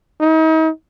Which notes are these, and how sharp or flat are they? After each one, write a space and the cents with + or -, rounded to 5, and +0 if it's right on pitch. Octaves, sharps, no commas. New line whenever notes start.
D#4 +40